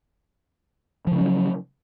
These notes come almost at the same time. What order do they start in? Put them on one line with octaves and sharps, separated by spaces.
F3 C#3 C#4 F#3